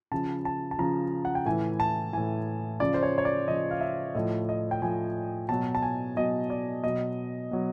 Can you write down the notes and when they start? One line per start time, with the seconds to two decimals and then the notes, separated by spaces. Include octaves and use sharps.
0.12 C#3 F3 A5
0.45 A5
0.71 A5
0.79 C#3 F3 A#5
1.25 F#5
1.35 G5
1.45 A2 E3 G#5
1.80 A5
2.13 A2 E3 G#5
2.80 C#3 F3 D5
2.94 C5
3.03 C#5
3.18 C#5
3.25 D5
3.48 C#3 F3 D#5
3.71 F5
3.81 E5
4.15 A2 F3 D#5
4.49 D#5
4.71 G5
4.82 A2 F3 G#5
5.49 B2 F#3 A5
5.75 A5
5.82 G#5
6.16 B2 F#3 D#5
6.50 D5
6.84 B2 F#3 D#5
7.51 B2 F#3